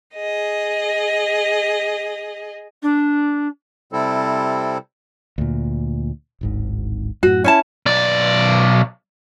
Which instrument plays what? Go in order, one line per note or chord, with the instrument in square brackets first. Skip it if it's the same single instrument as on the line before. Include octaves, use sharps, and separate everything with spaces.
[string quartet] G#4 D#5
[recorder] D4
[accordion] C3 G3 C4 E4 A4
[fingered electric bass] D2 A#2
D1 G#1 G#2
[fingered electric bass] F#2 A2 [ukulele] F#4
[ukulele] C#4 E4 A5
[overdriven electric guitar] B1 D5